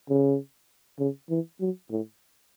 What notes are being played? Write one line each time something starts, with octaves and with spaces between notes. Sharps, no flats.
C#3
C#3
E3
F#3
A2